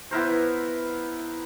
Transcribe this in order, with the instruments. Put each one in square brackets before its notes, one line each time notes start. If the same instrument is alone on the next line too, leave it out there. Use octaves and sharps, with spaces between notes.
[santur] B3 E4 A#4 C5